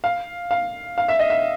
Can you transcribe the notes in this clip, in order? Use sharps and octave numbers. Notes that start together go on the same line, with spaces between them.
F5
F5
F5
E5
D#5
E5